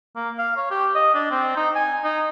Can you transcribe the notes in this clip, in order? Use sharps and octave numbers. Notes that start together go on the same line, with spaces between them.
A#3
F5
C#5
G4
D#5
D4
C4
D#4
G#5
D#4